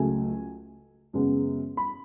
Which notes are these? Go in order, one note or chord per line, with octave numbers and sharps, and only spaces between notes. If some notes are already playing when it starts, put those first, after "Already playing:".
Already playing: C#2 C#3 F#3 A3 G#5
F#2 C#3 G#3 B3
B5